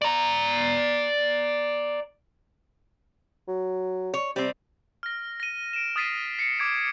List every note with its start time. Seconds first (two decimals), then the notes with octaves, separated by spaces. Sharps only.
0.02 D5 A#5
3.48 F#3
4.14 C#5
4.36 C3 G3 C4
5.03 F6 A#6
5.40 A#6 D#7
5.73 D7 E7
5.96 D#6 F6 A6 B6 C7 D#7
6.39 C7 C#7
6.59 D6 G#6 D7